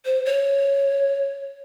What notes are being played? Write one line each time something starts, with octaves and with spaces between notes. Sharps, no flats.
C5
C#5